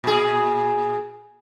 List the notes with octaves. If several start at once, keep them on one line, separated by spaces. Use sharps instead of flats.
A#2 G#4